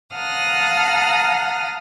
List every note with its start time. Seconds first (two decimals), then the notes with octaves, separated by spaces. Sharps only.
0.15 F5 F#5 A5 A#5 D#6 F6